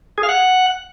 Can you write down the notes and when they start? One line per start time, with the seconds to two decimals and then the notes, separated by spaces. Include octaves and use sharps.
0.18 G#4
0.23 F5
0.29 F#5